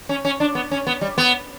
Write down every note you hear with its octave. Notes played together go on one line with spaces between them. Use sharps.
C#4
C#4
D4
B3
C#4
B3
G3
B3